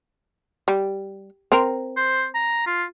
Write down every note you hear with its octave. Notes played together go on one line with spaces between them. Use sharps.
G3
C4 A#4
C5
A#5
F4